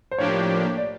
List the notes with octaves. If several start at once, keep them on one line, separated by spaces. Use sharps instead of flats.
C5
A2 F3 A#3 D4 G4 C#5
D5